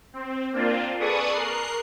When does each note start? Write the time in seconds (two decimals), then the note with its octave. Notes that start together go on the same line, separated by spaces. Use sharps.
0.14 C4
0.53 A#3 C4 D4 F4
1.00 G#4 A4 B4 D5 C#6 D#6
1.33 A#4 F#6 C7